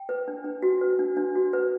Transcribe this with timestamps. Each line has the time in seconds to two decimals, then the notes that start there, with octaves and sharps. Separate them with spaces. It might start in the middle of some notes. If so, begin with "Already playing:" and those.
Already playing: G5
0.09 B4
0.28 D4
0.44 D4
0.62 F#4
0.81 B4
0.99 D4
1.17 D4
1.36 F#4
1.53 B4